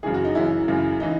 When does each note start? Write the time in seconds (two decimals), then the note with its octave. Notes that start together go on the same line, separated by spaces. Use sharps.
0.03 F#2 C#3 E3 G#4
0.14 F#4
0.24 D#4
0.35 F#2 C#3 E3 E4
0.68 F#2 C#3 E3
1.00 C#3 E3 D#4